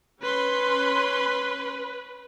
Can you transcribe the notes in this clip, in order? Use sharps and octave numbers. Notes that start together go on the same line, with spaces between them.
C#4 B4 B5 C6